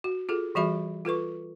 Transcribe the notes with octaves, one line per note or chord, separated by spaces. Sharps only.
F#4
F4 G#4 A4
E3 G3 F#4 G#4 E5 B5
F4 A4 B4 C#6